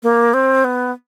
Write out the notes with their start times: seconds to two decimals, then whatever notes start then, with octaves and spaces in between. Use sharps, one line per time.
0.03 A#3
0.34 C4
0.64 B3